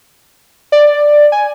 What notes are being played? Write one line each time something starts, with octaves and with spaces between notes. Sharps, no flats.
D5
G#5